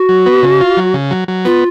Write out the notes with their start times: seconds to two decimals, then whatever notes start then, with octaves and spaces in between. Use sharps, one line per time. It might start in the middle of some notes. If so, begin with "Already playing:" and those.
Already playing: F#4
0.09 F#3
0.26 B3
0.43 C#3
0.61 F4
0.77 F#3
0.94 C#3
1.11 F#3
1.28 F#3
1.45 B3 F4